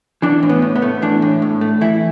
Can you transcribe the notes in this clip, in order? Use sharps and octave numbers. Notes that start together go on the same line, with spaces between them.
E3 D4
A2
B3
A2
B3
A3
E3 D4
A2
A2
A3
E3 E4